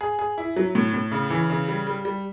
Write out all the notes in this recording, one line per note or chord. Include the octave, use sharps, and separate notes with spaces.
G#4
G#4
E4
F#3
A2
A2
C#3
E3
C#3
G3
G3
G3